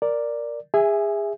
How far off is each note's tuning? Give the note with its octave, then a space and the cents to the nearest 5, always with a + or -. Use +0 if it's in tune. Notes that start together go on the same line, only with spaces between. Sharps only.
A#4 +0 D5 +0
G#4 -25 E5 +0 G#5 +0